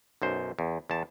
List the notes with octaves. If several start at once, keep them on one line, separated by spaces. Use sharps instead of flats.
B1 F#2 C5
E2
E2 A5